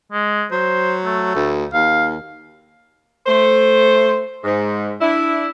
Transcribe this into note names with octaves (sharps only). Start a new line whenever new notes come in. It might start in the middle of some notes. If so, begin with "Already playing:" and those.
G#3
F#3 C5
A3
D2
D#2 F5
A3 C5
G#2
D4 E4